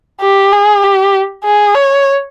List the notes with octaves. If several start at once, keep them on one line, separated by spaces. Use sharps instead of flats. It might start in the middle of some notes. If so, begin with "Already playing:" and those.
G4
G#4
G4
G#4
C#5